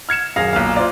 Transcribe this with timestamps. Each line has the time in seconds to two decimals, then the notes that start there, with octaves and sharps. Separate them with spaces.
0.09 F6 G#6 C#7 E7
0.36 D#1 F#2 G#4 F5 A#6
0.53 B1 A#2 F5
0.76 F4 C5 D5